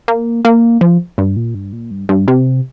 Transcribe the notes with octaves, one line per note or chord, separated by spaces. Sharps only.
A#3
A#3
F3
G2
A#2
G2
A#2
G2
G2
C3